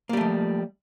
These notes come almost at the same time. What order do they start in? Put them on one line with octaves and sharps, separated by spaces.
A#3 G3 A3 F3